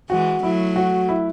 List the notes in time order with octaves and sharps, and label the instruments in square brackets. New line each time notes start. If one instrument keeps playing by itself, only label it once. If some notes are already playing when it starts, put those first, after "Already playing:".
[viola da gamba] E3 G#3 [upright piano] F#4
[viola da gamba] F#3 A3 [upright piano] E4
[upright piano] F#4
E4